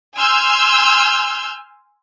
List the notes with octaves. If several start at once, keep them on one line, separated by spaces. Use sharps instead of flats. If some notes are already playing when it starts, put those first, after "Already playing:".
G#5 C6 E6 F6 G6